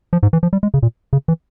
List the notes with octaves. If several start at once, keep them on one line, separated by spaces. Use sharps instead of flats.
F3
G#2
E3
F3
G3
G#3
C#3
A#2
C#3
E3